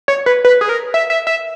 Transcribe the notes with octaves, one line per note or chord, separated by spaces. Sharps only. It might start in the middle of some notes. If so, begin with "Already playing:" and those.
C#5
B4
B4
G#4
A#4
E5
E5
E5